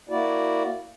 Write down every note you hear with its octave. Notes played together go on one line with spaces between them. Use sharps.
A#3 E4 F#4 D5